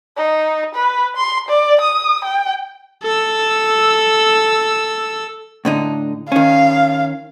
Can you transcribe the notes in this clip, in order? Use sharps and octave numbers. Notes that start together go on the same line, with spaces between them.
D#4
B4
C6
D5
D#6
G5
A4 E6
A2 D3 D#4
D#3 C#4 F5